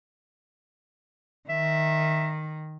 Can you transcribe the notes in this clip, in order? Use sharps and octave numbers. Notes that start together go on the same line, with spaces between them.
D#3 E5